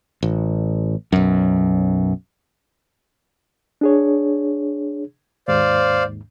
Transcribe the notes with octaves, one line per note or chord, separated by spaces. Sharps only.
A1
B1 F#2
D4 G#4 C#5
D#2 G#2 C5 D5 F5